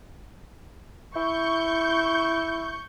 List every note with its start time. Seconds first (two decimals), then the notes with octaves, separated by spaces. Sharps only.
1.16 E4 C#6 G6